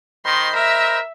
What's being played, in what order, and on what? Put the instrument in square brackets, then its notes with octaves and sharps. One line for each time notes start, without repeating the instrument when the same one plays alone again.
[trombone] D#3 [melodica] C5 D#5 B5 [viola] C6
[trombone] A#4 [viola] E5